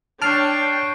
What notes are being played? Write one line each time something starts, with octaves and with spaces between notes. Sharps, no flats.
D4 C#5 G5 A5 C#6 F6 C7 D7